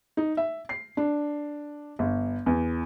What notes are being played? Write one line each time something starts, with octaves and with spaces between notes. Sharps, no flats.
D#4
E5
C7
D4
G1
E2